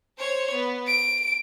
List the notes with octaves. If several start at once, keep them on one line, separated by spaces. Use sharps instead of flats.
C5 C#5
B3
D7